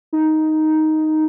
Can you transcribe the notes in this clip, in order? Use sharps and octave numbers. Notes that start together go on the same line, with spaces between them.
D#4